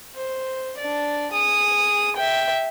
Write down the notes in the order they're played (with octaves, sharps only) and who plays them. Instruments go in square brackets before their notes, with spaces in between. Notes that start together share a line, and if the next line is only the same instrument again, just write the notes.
[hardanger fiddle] C5
D4 D5
G#4 D#6
E5 G5